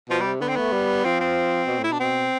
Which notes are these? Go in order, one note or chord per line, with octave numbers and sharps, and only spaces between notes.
B2 F3
G3
C3
D3 B3
C4
A3 B3
G3
F3 C4
C4
B2
A2
E4
B2
D4
B2 C4